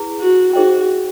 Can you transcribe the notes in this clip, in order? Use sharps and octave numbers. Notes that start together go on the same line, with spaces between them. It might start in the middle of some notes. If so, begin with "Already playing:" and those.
Already playing: E4 G#4 B4
F#4
D#4 F#4 G#4 C5 D#5 G5